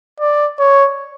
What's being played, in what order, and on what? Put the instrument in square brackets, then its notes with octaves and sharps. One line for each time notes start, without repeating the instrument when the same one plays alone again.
[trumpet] D5
C#5